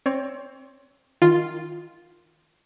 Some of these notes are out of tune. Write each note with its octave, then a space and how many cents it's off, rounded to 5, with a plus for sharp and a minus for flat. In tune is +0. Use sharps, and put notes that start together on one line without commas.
C4 +20 C#5 +35
D#3 +0 F4 +0